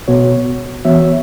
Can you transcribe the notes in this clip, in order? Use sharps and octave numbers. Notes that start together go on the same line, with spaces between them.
B2 B3 F#4 C#5
E3 B3 F#4 C#5 E5